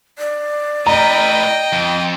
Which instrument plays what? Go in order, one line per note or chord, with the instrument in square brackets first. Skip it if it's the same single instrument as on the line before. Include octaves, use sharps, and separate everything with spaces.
[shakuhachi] D5
[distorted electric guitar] A2 B4 [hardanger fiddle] D#5 G5 [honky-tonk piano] A#5
[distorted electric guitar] F2